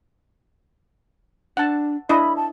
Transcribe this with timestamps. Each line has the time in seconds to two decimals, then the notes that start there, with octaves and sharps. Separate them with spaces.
1.57 D4 F#5 A5
2.09 D4 E4 D#5 B5
2.36 A5